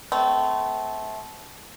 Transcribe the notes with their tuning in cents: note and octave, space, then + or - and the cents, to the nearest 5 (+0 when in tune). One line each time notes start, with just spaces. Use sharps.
A3 -20 C4 -40